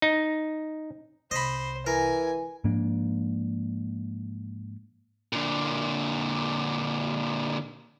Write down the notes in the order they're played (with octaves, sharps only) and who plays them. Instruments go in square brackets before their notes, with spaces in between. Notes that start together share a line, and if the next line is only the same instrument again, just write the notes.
[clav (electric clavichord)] D#4
[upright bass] C2 [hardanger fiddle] C5 [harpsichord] D#5 B5
[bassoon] E3 [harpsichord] A#4 [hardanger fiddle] G#5
[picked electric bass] G#2 F3 A#3 D4
[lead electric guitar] A#2 D3